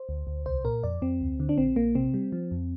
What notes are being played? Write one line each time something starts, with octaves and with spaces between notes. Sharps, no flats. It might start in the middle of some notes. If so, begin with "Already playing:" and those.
Already playing: C5
D2
D2
C2 C5
A#2 A#4
F2 D5
F2 C4
D2
D3
D4
A#1 C4
A#1 A#3
C3 C4
G3
F3
F2